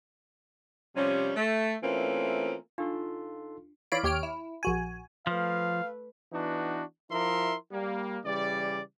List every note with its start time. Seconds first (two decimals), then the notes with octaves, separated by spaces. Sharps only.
0.96 C3 F3 G3 C#4
1.36 A3
1.83 E3 A3 A#3 C4 C#4 F4
2.78 D4 D#4 F4 G4 A4 C6
3.92 E3 C#5 D5 F5 B5 D7
4.03 D#2 G4 C#5 F6 D7
4.23 E4
4.63 A#1 F#4 G#5
5.27 F3 A3 B4 F5
6.32 E3 B3 D4 D#4 F#4
7.11 F3 E4 A#4 E5 C6
7.72 G3 A#3
8.25 C#3 E3 G3 D5